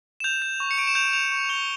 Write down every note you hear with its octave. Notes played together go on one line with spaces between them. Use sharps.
E7
G6 F7
G6
C#6
C#7
C#6 D7
E7
G6 F7
G6 F7
C#6
C#6 G7